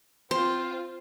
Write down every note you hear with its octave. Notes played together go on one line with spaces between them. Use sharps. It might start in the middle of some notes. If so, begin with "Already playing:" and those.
C4 F4 C5